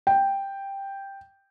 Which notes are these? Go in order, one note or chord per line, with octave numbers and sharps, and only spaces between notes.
G5